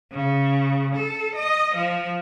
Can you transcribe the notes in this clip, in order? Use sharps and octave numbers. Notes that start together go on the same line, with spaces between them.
C#3
A4
D#5
F3